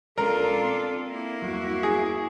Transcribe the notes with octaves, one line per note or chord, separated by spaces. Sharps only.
B1 G#3 C#4 D4 F4 A4 A#4
C4
A#3 E4
E2 G2 F#3 F#4
G#4